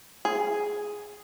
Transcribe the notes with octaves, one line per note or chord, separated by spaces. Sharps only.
G#4